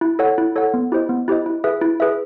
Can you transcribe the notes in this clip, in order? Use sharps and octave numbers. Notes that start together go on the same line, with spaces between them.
E4
A4 C#5 F#5
E4
A4 C#5 F#5
B3
E4 G4 C5 D#5
B3
E4 G4 C5 D#5
E4
G#4 B4 E5
E4
G#4 B4 E5